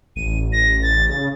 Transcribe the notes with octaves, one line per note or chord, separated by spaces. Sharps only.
A1 D#7
A#6
A6
C#3 A6